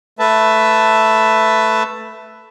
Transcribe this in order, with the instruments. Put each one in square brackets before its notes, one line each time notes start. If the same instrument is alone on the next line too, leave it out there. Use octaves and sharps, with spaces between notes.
[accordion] A3 B4 E5 A5